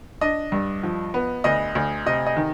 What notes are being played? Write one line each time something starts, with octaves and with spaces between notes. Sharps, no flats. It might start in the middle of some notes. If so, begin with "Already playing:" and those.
D4 D#5
G2
F3
B3
D2 D#5
D2
C3 D#5
D#5
D#3